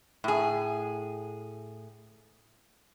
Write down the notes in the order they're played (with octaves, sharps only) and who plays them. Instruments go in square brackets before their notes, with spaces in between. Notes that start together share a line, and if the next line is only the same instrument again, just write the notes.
[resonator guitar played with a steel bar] A2 G#4